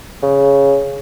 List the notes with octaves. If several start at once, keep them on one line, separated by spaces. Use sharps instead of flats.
C#3